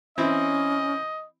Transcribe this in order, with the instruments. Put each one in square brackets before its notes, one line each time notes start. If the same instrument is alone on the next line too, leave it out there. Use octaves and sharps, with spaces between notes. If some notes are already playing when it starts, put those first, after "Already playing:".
[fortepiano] E3 C4 E4 [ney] C#4 [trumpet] D#5